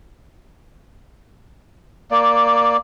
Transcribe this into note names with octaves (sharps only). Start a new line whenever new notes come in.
A#3 D5